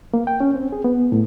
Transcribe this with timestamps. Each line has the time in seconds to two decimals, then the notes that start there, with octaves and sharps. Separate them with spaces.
0.14 A#3
0.27 G5
0.40 C#4
0.54 C4
0.72 G#4
0.84 B3
1.12 A2